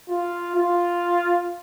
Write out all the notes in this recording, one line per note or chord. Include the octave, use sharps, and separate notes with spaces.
F4
F4